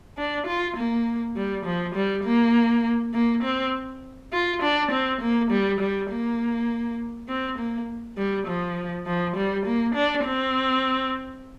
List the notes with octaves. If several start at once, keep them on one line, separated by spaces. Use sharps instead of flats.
D4
F4
A#3
G3
F3
G3
A#3
A#3
C4
F4
D4
C4
A#3
G3
G3
A#3
C4
A#3
G3
F3
F3
G3
A#3
D4
C4